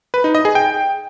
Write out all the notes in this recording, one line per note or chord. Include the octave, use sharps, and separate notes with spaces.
B4
D#4
D#5
G#4
G5